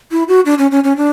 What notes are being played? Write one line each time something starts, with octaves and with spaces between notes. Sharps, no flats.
E4
F#4
D4
C#4
C#4
C#4
D4